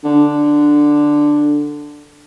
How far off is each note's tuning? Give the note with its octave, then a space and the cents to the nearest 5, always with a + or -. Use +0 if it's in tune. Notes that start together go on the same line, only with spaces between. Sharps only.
D3 +5